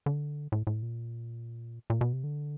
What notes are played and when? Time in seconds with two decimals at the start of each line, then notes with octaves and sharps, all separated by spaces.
0.06 D3
0.52 A2
0.67 A2
0.83 A#2
1.90 A#2
2.01 B2
2.13 C3
2.24 D3